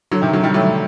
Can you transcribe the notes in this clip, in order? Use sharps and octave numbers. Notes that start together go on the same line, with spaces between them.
D3 F#3
C3 D#3
D3 F#3
D#3 G3
F#3 A3